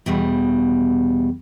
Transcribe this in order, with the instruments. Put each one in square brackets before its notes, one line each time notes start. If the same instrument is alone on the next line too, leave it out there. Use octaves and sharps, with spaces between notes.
[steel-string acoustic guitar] E2 B2 G3